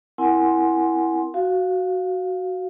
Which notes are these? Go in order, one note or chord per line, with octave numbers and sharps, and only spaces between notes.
C4 E4 A#4 F#5 G#5 C6
F#4 F5